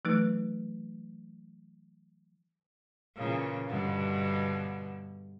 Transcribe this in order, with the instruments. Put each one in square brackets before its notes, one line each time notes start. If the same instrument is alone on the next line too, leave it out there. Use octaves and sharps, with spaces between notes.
[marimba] E3 F#3 A3 D#4 B4
[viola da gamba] A#2 C#3 E3
G2 B2 D3